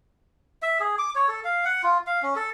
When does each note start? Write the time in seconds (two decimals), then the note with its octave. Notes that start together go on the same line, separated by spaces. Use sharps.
0.62 E5
0.80 G#4
0.98 D6
1.15 C#5
1.28 A4
1.45 F5
1.65 F#5
1.84 F4
2.07 F5
2.23 C#4
2.36 A4